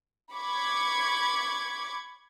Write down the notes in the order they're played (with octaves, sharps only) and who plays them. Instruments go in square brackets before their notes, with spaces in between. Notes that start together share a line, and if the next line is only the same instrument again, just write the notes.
[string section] B5 C#6 D6 G#6